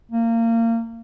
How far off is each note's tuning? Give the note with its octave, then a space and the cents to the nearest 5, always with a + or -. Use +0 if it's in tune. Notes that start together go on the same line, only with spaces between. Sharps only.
A#3 -25